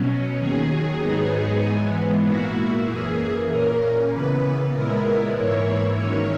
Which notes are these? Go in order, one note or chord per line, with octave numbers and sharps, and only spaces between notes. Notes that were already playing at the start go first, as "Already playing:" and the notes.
Already playing: B2 F#3 C#4
D#2 D#3 F#3 G#4
G#2 F#3 B3 D#4
G#2 E3 G#3 B3
A#2 A#3 E4 F#4
F#2 E3 A#3 G#4
A#2 A#3 C#4 A#4
C#3 E3 B3 B4
A#2 G#3 B3 E4 A#4
G#2 E3 A#3 E4 C#5
G#2 D#3 F#3 C#4 C#5